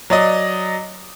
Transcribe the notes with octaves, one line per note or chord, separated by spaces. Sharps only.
F#3 D5 D#5